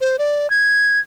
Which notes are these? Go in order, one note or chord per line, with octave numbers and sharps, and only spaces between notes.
C5
D5
G#6